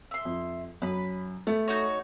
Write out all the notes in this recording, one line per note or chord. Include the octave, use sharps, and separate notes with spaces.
E5 C6
F2
F#2 B4 B5
A3 B3
D#4 F#4 C#5